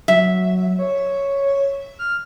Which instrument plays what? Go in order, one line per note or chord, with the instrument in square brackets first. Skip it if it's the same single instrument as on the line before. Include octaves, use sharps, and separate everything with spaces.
[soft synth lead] F#3 [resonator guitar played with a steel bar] E5
[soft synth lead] C#5
F6